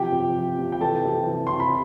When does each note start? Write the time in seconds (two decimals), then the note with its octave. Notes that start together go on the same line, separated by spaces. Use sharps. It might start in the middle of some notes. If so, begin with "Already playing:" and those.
Already playing: C3 E3 F3 G4 G5
0.12 C3
0.36 F3
0.58 C3
0.72 G5
0.81 E3 A4 A5
1.05 C3
1.26 E3
1.47 C3 C6
1.60 B5